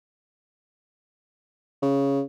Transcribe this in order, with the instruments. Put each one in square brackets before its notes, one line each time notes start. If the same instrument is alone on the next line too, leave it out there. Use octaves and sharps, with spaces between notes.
[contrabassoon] C#3